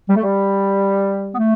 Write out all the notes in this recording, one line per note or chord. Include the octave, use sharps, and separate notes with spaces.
G3
A3
G3
B3
A3